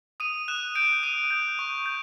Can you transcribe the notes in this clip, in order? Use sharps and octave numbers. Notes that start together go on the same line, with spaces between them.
D#6 D#7
F#6 E7
G6 D7
D#6 D#7
G6
C#6
G6